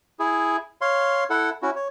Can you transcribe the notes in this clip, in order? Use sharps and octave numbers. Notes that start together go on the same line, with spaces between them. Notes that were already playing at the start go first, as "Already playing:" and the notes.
E4 G#4
C#5 F5 C6
E4 A4 F#5
C#4 E4 F#4
C#5